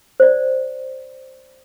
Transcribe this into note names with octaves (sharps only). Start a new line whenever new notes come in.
C5 D5